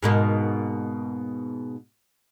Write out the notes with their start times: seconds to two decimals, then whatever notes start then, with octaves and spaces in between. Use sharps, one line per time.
0.03 G#2 B2 A#3